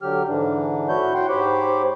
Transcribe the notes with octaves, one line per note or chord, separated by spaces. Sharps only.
D3 F#3 G4 F6
G#2 D3 E3 D4
E4 F#4 C#5 G6
F#4 F#5 G5 C6
G#2 G4 C5 C#5 B5 D6